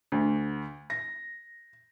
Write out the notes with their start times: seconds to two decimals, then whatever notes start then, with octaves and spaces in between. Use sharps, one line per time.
0.12 D2
0.90 A#6